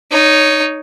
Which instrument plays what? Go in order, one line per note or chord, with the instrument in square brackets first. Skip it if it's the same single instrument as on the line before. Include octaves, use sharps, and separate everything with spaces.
[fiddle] D#4 C#5